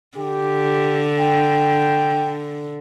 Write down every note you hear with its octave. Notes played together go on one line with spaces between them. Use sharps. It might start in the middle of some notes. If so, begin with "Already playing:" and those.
D3 G4
G5